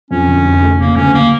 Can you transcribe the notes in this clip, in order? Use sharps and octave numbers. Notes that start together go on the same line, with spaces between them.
F2 C#4
D3
F1
A3
C#3 A#3
D2 C#4
D2 A#3